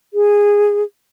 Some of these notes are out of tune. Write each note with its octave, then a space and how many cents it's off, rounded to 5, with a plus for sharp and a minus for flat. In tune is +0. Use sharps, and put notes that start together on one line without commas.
G#4 -10